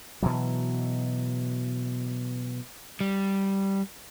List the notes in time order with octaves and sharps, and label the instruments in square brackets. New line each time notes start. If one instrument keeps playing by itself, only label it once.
[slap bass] B2 E3 F#3
[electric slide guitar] G3